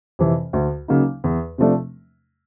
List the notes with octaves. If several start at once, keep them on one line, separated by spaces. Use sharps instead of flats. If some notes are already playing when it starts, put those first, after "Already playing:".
F2 C3 E3
D2
C#3 F#3 A#3 D#4
E2
C3 F3 A3 D4